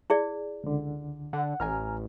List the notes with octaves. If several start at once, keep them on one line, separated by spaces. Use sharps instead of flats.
E4 G#4 D5
C#2 D3
D3 F#5
A1 G#5 A#5 F6